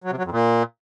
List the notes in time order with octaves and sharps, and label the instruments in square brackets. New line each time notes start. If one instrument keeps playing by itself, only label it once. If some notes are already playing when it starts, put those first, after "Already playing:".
[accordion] F#3
C3
F#3
F2
A#2